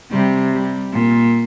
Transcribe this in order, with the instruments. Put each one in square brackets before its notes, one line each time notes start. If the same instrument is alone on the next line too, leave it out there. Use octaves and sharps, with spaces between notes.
[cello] C3 [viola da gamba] G3
[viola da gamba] G3
[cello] A#2